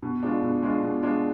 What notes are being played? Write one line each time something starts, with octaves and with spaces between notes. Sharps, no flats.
B2
G#3 D4 F4
B2
G#3 D4 F4
B2
G#3 D4 F4